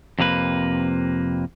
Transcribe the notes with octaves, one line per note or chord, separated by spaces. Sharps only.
F2 C3 A#3 B4